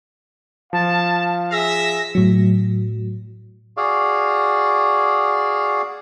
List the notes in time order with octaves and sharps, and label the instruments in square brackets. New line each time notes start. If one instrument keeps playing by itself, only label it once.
[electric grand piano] F3 [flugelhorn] F5 [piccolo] A5
[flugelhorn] G#4 [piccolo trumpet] E5 [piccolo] A#6
[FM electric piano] A2 F#3
[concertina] F#4 G#4 D5 F5